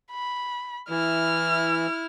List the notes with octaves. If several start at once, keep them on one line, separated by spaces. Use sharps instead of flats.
B5
E3 E4 F6